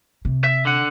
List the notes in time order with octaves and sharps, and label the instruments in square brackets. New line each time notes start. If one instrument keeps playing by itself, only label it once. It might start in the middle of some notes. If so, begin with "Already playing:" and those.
[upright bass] C3
[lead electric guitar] E5
D3 F#5